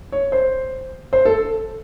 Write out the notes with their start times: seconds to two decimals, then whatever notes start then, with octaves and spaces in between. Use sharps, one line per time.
0.12 C#5
0.32 C5
1.13 C5
1.25 A4